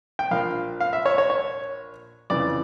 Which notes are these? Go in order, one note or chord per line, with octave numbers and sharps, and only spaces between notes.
G5
A#1 A#2 F3 F5
F5
E5
C#5
C#5
C#5
F2 C#3 E3 D5